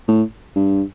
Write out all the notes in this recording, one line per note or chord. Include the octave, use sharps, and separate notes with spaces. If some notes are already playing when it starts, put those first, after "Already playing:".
A2
G2